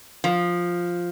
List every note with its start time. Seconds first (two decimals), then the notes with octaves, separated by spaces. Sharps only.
0.24 F3